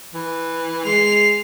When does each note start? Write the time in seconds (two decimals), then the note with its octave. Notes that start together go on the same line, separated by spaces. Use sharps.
0.14 E3
0.85 G#3 C7 F7